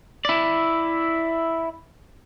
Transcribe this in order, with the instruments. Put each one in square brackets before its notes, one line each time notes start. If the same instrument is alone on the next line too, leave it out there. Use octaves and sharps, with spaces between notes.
[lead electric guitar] E4 D5